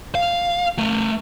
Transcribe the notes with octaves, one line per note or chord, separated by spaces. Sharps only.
F5
A3 A#4